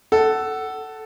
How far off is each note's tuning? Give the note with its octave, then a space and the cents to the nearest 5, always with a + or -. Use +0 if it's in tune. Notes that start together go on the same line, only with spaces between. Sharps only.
A4 +0 F#5 +20